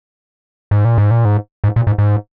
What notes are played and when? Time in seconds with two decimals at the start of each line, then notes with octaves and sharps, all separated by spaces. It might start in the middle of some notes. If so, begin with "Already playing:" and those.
0.71 G#2
0.85 A#2
0.98 G#2
1.11 A#2
1.25 G#2
1.64 G#2
1.76 A#2
1.87 G#2
1.98 G#2